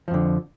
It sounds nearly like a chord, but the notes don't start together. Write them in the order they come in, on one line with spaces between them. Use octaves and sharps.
F3 F2 D3